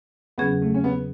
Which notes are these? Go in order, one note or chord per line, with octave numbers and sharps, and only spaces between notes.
E2 C#3 F#3 B3 C#4 G#4
A3
C#4
B3